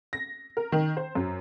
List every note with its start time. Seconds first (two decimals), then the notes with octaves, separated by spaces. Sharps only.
0.13 A#6
0.57 A#4
0.72 D#3
0.97 C5
1.15 F#2